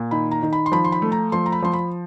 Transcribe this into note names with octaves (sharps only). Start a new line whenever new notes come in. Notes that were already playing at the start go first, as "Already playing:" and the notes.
Already playing: A#2
D#3 B5
A#5
D#3
B5
C6
F3 B5
C6
B5
A3
A#5
F3 C6
A#5
B5
F3 C6
B5